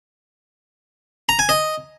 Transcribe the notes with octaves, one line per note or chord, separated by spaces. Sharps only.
A#5
G#5
D#5